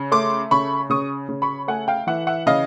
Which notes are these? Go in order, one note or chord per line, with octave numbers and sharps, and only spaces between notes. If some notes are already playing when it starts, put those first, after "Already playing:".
Already playing: C#3
A3 C6 D6
C#3 B5 C#6
C#3 C#6 D#6
C#3
B5 C#6
A3 F#5 G#5
F5 G5
E3 E5 F#5
E5 F#5
C#3 D#5 F5